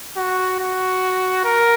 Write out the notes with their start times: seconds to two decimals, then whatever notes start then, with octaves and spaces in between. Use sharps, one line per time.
0.17 F#4
0.60 F#4
1.45 A#4